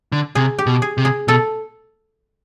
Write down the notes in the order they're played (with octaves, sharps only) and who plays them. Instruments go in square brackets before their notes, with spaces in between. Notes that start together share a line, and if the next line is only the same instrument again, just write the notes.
[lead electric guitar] D3
[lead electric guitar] C3 [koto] G#4
[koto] G4
[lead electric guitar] B2
[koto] G#4
[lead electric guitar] C3
[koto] G#4
[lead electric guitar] B2 [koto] A4